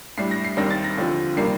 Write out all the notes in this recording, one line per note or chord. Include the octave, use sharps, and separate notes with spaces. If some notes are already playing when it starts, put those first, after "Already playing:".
A2 G3 D4 C7
A#6
C7
D#2 D#3 G3 C4 A#6
A6
A#6
D#2 D3 F3 C4
C3 D#3 G3 A#3 C7